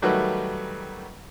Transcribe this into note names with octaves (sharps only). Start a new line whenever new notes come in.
D#3 F#3 G3 A3 F#4 B4